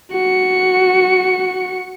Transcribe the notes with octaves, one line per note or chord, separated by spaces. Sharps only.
F#4 C#7